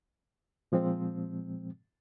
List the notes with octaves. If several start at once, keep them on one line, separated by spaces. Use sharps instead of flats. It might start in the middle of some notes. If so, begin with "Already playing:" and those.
A#2 F3 G#3 C4